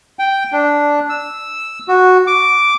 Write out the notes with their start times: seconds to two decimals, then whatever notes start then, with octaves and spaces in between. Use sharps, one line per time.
0.19 G5
0.52 D4
1.09 E6
1.88 F#4
2.27 D6